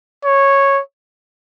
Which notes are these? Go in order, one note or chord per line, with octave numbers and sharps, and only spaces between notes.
C#5